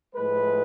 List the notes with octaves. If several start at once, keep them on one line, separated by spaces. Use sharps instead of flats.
A2 F3 G#3 B4